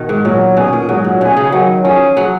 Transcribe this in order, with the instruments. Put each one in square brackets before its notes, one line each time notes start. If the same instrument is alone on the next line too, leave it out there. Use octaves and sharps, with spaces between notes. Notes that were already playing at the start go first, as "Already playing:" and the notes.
Already playing: [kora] B2 D#3
G#2
[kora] A#2 [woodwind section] F#3
[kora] B2 [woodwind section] C#4 G#4
[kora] A#2
[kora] G#2 [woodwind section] F#3
[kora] A#2
[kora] B2 [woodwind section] C#4 G#4
[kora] C#3
[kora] D#3 [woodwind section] F#3
[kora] F3 [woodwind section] C#4 G#4
[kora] F#3